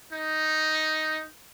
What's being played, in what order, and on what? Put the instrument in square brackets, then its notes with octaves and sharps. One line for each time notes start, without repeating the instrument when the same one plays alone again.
[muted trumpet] D#4